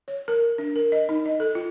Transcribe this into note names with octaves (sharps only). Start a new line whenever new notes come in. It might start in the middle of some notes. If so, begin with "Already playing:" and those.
C#5
A#4
D4
A#4
D#5
D#4
D#5
A4
F4